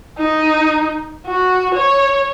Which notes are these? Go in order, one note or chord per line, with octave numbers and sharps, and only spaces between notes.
D#4
F#4
C#5